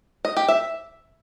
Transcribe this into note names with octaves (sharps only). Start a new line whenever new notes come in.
D#5
G4
E5